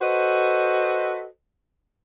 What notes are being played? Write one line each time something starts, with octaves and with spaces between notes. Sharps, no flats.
F#4 A4 B4 C5 D#5